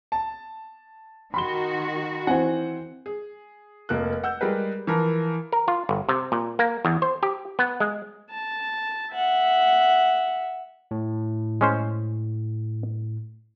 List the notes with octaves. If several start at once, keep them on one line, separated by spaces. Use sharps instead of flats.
A5
D#3 F#4 B5 C6 G7
E3 C4 C5 F#5 G#5
G#4
F1 A#3 A4 F#6
F#5 E6 G6
G3 G#3 G#4 A#4 B4
E3 F3 A#4
A#4
F4
G1
C3
A#2
A#3
E2
C5
G4
B3
G#3
A5
E5 F#5
A2
G#3 C#4 C5